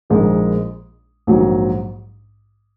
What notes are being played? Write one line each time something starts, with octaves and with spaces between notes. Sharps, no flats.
A#1 A#2 F3 G#3 D#4
A#1 G#2 F#3